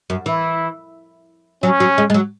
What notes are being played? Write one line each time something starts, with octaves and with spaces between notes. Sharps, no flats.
F#2
E3 E4
F#3 C#4
F#3
G#3
G#3
F#3